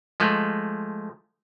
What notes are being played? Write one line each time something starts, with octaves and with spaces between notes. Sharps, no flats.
F3 G#3 A3